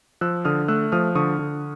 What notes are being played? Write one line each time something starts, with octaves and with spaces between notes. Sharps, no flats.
F3 E6 F#6
D3 D#6 F6
A3 E6 F#6
F3 D#6 F6
D3 C#6 D#6
D3